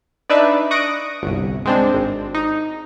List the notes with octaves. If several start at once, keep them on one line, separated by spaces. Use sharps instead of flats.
D4 D#4 B4 D5 E5
C#6 D#6 F#6 A#6 D7
G1 C2
G#3 C4 D4
G#1
D#4